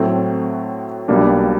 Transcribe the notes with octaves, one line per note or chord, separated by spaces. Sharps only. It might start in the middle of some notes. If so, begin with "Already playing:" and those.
Already playing: A2 F#3 A3 C4
B1 B2 G3 A#3 D4